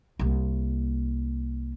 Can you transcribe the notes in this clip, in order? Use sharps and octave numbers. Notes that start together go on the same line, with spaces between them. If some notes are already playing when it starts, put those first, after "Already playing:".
C2 A#3